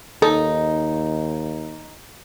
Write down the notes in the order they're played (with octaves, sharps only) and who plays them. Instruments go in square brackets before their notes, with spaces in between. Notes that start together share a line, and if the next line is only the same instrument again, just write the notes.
[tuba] D#2 [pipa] D#4 [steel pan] A4